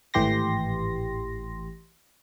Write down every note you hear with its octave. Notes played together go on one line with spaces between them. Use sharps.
G#1 A2 E3 G4 C6 A#6